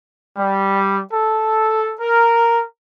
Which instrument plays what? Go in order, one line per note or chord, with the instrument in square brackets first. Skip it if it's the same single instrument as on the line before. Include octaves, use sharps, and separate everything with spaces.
[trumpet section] G3
A4
A#4